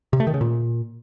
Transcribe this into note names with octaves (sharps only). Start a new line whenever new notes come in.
C3
A3
D#3
C#3
A#2